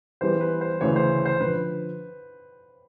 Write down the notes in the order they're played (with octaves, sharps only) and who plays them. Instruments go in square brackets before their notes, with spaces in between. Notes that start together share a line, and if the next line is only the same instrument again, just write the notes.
[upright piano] E3 G3 B3 [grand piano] C5
[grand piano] B4
C5
[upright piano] D2 C#3 E3 [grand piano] C#5
[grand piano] C5
C5
[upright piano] D3 F3 [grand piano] B4